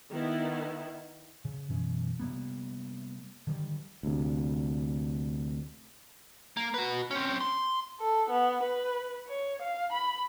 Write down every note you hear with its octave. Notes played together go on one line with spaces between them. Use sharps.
D#3 B3 E4
C#3
F#2 B2 E3 C#4
C3 G3 A#3 B3
D3 D#3 G3
D2 C3
A#3
F#4 B4
C4 C#4
C6
A4
B3
B4
C#5
F5
B5